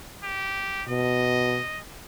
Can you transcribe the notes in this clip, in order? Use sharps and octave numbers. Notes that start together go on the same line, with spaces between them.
G4
B2 D#5